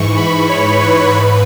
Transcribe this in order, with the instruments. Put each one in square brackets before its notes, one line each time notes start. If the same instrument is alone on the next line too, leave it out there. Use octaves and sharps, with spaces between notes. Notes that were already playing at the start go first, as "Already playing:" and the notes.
Already playing: [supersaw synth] G#2 E3 C#6
B5
C#5
B4
G#2